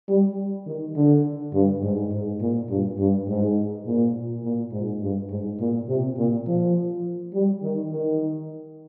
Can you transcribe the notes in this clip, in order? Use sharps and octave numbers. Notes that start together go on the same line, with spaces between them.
G3
D#3
D3
G2
G#2
G#2
A#2
G2
G2
G#2
A#2
A#2
G#2
G2
G#2
A#2
C3
A#2
F3
G3
D#3
D#3